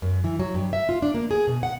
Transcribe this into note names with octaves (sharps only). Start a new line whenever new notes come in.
F#2
E3
F#3
G2
E5
F4
D4
A#3
G#4
B2
F#5